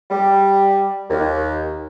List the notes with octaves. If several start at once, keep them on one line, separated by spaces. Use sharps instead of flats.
G3
D#2